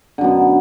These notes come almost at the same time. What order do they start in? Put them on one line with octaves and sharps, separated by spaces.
D3 F#2 B2